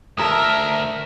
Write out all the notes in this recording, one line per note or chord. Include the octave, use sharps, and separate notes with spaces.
D2 A#4 E5 A5 A#5 D#6